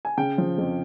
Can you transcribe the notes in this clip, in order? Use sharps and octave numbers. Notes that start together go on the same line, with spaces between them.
G#5
C#3 G5
F3
F2